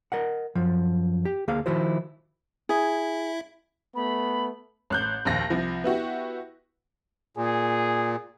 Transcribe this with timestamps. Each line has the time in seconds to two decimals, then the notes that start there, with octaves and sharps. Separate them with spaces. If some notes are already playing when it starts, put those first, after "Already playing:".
0.12 A#4 D#5 F#5
0.55 F#2 F3
1.25 G4
1.48 D2 A#3 G#4 F5
1.66 D#3 F3 E4 F#4 C5
2.69 E4 G#4 E5
3.95 A3 B3 B5
4.90 A1 F#6 G6
5.25 A#1 D#2 A#6
5.50 C2 F3
5.84 B3 E4 F#4 G4
7.37 A#2 G#4